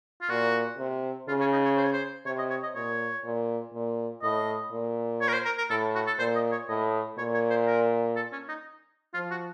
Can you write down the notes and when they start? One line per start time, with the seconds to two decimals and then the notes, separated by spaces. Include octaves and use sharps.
0.21 F4
0.29 A#2 F#4
0.78 C3
1.28 C#3 F4
1.41 C#4
1.53 D#4
1.65 C#5
1.77 C5
1.85 C#5
1.93 C5
2.26 C3 C#5
2.39 D#5
2.50 C#5
2.63 D#5
2.75 A#2 C#5
3.25 A#2
3.74 A#2
4.23 A2 D#5
4.71 A#2
5.21 C#5
5.28 A#4
5.33 C5
5.46 A#4
5.58 A#4
5.70 A2 A4
5.95 F#4
6.07 A4
6.19 A#2 C5
6.36 D#5
6.52 C#5
6.68 A2 D#5
7.18 A#2 C#5
7.34 C#5
7.50 C5
7.66 A#4
8.16 A4
8.32 C#4
8.49 D#4
9.14 F3 F4
9.31 F#4